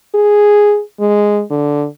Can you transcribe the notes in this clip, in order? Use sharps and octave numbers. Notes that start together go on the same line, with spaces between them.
G#4
G#3
D3